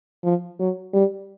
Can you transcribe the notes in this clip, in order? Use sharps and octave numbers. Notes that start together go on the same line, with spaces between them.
F3
F#3
G3